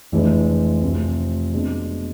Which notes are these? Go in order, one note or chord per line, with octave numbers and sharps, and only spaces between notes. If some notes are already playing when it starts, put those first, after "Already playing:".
F1 F2 E3 G#3 D4
F1 F2 C3
B2 G#3 D4